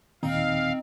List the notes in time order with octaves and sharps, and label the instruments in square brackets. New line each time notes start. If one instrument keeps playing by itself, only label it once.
[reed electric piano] D#2 A#2 D#3 [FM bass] C4 [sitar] D#4 [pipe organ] F5